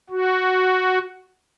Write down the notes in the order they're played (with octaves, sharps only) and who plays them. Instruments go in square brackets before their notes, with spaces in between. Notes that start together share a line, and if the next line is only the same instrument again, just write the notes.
[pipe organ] F#4